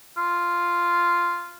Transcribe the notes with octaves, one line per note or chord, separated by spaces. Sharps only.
F4